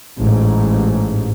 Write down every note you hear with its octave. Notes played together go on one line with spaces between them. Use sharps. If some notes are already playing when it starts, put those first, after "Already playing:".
A1 G#2